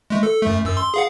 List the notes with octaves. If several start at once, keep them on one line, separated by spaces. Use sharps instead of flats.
G#3 A3
A4
F#2 A3
F#2 E6
C6
G#4 F5 F#5